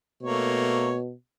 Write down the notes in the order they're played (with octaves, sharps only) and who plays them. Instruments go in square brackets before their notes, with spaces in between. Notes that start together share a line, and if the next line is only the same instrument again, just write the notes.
[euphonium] B2 [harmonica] A3 A#3 C#5